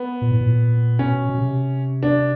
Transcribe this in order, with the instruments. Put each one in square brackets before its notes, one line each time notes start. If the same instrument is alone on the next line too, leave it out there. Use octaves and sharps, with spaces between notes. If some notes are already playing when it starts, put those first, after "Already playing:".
Already playing: [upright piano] B3
[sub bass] A#2
A2
A#2
[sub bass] B2 [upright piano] C#4
[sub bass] B2
C3
[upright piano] D4